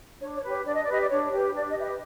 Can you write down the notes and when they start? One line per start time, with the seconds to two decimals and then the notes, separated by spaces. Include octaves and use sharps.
0.20 D4 C#5
0.35 C#5
0.43 G4 B4
0.50 C#5
0.65 D4 D5
0.74 D#5
0.83 D5
0.87 G4 B4 D#5
1.00 D5
1.10 D4 C#5
1.31 G4 B4 C#5
1.54 D4 D5
1.69 D#5
1.76 G4 B4 E5
1.84 D#5